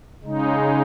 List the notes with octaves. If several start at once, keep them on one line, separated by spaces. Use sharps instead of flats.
C#3 G#3 D#4